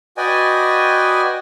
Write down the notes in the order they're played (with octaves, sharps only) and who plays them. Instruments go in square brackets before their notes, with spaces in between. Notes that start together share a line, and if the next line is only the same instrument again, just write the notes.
[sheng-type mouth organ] F#4 B4 D5 D#5 G5 G#5